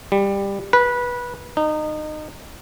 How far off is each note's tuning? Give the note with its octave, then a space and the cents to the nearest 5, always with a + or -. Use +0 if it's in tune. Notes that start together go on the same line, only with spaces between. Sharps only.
G3 +15
B4 -20
D#4 -25